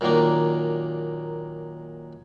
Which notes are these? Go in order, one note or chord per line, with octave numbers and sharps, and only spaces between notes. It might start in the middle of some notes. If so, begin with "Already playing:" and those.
F#2 A#2 D#3 A#3 D4